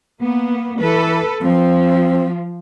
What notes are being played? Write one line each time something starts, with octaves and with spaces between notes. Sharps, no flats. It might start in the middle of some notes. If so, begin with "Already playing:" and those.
A#3 B3
E3 A4 B4
F3 C4